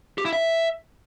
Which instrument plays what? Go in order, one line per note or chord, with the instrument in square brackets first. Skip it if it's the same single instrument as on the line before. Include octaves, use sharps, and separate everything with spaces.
[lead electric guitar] G4
E4
E5